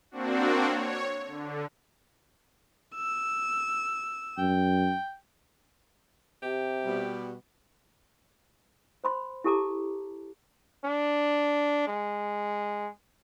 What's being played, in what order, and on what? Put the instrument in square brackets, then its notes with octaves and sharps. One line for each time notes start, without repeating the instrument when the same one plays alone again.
[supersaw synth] A#3 C4 D4 F#4
C#5
D3
[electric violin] E6
[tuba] F#2 [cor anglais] G5
[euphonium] C3 [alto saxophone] G4
[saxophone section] B2 G3
[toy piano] C5 B5 C6
E4 G4 A4 A5 A#5 D6
[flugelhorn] D4
G#3